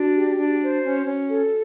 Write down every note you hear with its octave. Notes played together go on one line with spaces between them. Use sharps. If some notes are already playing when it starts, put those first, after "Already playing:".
Already playing: D4 F#4
G4
D4
C5
C#4
C#4
A4